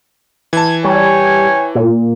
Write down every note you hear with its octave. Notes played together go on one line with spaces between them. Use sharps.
E3 A5 G#6
G3 C#5 G5 G#5
A#2